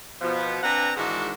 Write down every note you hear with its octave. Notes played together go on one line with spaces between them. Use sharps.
B2 F3 B3
C4 D4 B4 F#5 G#5 A#5
G#2 D#3 E3 G#3 D4 F#4